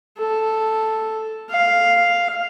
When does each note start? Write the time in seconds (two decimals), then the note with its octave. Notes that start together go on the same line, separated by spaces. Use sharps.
0.18 A4
1.50 F5